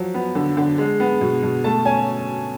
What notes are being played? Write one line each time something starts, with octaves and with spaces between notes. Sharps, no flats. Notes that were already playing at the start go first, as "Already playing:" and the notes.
Already playing: F3 F#3
B3
D3
D3
G#3
B3
B2
B2
A3 A5
C#4 G#5